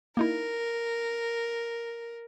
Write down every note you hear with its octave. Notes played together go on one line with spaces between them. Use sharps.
A#3 D#4 E4 A#4